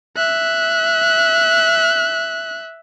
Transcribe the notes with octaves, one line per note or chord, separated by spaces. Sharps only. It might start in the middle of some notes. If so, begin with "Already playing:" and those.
E5 F#6